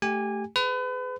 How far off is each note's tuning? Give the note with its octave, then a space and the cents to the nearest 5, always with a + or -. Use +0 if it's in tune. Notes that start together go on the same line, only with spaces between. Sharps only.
A3 +0 G4 +0 G#5 -20
G#4 +15 B4 +35